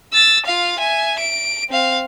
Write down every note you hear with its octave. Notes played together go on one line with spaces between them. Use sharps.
E6 A6
F4 F5
E5 G#5
D7
C4 F5